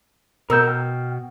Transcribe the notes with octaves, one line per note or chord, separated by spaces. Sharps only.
B2 A#4 E6 G6
G5 F6